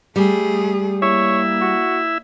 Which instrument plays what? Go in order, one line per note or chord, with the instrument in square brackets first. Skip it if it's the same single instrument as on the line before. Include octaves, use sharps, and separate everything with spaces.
[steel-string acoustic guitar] G3 [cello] A3 G#4
[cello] A#3 [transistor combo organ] E4 E5 [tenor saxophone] C#5
[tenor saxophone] F#4